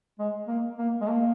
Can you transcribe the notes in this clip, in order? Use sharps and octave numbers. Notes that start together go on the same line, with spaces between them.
G#3
A#3
A#3
G#3
A#3